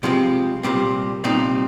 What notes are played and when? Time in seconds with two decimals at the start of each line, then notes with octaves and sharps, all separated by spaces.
0.03 C2 C3 F3 G#3 C4
0.63 C2 A#2 G3 C4
1.24 C2 A#2 G3 C4 D#4